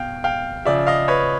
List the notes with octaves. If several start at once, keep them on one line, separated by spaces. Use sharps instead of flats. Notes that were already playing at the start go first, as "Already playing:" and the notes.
Already playing: B2 F5 G5
F5 G5
C#3 F3 D5 E5
D#5 F5
B4 C#5